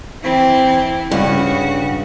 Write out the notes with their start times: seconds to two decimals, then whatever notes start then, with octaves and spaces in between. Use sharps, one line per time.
0.24 E3 C4 E4
1.11 G2 C#3 F#4